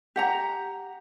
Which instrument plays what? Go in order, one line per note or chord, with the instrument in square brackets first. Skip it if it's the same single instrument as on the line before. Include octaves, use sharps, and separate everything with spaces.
[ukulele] G4 F#5 A#5